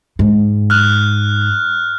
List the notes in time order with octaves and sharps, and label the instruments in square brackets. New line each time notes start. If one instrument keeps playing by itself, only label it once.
[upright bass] G#2
[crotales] F6 F#6